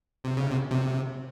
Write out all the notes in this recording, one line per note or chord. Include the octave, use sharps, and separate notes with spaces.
C3
C#3
C3
C3